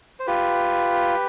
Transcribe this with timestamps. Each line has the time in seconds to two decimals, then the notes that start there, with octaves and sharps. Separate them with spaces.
0.20 C5
0.27 F4 G4 B4